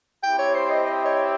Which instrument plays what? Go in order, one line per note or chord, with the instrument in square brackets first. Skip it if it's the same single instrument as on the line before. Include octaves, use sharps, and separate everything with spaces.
[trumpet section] C4 E4 G4 [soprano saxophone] G5
[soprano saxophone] C#5
C5
D#5
D#5
C#5